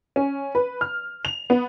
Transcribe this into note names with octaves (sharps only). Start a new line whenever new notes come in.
C#4
B4
F6
F7
B3